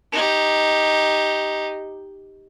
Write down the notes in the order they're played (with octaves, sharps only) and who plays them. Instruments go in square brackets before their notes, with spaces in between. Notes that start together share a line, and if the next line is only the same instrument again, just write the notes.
[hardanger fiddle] D#4 G4